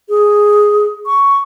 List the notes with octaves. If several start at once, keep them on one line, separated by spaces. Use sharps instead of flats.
G#4
C#6